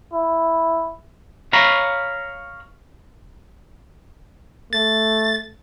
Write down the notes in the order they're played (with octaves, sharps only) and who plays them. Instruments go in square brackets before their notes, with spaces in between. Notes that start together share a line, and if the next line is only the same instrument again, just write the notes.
[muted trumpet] E4
[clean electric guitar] C#5 F5 A#5 B5
[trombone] A3 [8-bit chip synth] A6